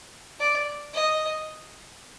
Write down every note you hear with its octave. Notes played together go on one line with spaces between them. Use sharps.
D5
D#5